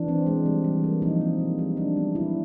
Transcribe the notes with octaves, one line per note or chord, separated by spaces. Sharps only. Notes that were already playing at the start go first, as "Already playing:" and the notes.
Already playing: E3 D4
C4
G#3
G3
E3
A#3
F3 D#4
C4
G#3
G3
D4
B3
F#3 E4